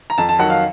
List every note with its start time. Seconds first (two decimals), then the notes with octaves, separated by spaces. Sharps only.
0.10 A#5
0.18 F2 A5
0.29 A5
0.39 D#3 F#3 F#5
0.50 F5